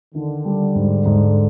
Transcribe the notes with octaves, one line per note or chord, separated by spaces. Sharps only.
D3 D#3
G3
G#2
G#2